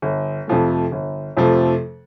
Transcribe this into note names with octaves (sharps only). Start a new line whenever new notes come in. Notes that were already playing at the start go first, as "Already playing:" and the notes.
G1
F2 C3 F3 A3
G1
F2 C3 F3 A3